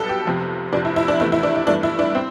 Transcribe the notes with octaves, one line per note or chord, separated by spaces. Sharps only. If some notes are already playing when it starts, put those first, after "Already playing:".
Already playing: B1 B2 G3 B3 A4
G4
F1 F2 C3
F1 F2 C3 D4
E4
E4
D4
E2 C3 E3 A3 E4
E4
D4
E4
G2 E3 A3 D4
E4
D4
C4